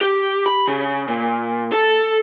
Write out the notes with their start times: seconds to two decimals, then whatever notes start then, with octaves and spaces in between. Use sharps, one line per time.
0.01 G4
0.46 B5
0.68 C#3
1.08 A#2
1.72 A4